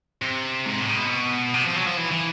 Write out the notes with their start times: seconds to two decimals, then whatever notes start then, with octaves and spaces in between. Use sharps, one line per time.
0.22 C3
0.66 G#2
0.81 A2
0.89 C3
0.95 B2
1.54 C3
1.64 F3
1.76 F#3
1.87 F3
1.97 E3
2.12 E3